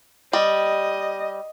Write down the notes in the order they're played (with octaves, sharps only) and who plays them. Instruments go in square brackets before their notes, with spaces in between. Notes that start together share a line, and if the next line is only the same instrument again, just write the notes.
[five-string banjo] G3 [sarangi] D#5